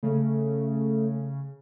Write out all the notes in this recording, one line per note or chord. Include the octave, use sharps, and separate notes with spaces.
C#3 A3